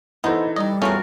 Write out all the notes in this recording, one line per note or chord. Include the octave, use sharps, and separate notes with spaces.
E3 B3 D#4 A4 C5
G3 D#4 D5 D#5
E2 A3 C#4 F4 F#4 A#4